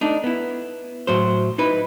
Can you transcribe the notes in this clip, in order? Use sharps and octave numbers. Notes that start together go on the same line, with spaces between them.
A3 D4 D#4
B3 E4
A2 F#3 C5
D#4 E4 B4